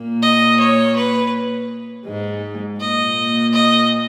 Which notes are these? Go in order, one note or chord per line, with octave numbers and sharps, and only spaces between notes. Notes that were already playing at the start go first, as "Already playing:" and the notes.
Already playing: A#2 A#3
D#5
C#5
B4
G#2 G#3
A#2 A#3 D#5
D#5